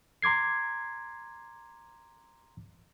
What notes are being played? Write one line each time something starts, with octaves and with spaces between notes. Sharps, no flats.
A#5 C6 D6 G#6 C7